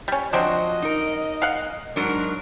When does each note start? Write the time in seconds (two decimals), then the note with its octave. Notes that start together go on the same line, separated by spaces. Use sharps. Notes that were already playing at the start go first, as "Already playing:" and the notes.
0.08 G3 C#4
0.33 F3 F#3 C4 D4 F#4 D#5
0.82 D#4 A#4
1.42 F5 F#5
1.96 G#2 F#3 D4 A#4